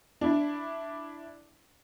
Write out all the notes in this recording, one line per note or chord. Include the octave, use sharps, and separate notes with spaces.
D4 E4